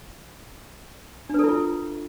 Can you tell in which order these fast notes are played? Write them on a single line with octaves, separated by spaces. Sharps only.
D4 B4 A4 E4 F4